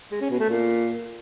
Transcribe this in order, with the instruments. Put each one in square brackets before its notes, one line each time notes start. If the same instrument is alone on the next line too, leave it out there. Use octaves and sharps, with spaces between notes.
[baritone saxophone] G#3
C#4
B2
A3
A#2